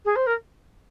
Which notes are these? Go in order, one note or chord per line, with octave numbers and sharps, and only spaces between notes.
G#4
C5
A#4